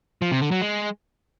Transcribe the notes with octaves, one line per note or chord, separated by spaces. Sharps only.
F3
C3
D3
F#3
G#3